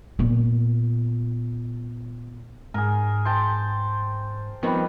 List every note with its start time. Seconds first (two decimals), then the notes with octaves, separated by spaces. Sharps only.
0.19 A#2 B3
2.74 G#2 G#4 A#4
3.25 C5 G5 A5
4.63 D#3 F3 G3 B3 C4 B4